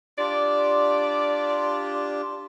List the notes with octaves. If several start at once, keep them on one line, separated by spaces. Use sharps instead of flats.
D4 F4 G4 D5